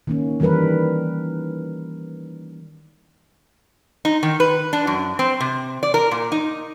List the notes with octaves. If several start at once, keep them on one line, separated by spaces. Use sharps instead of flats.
D#3 A#3 C#4
D#3 E3 G3 A#4 B4
D#4
D#3
B4
D4
F#2
C4
C3
D5
A#4
A#2
D#4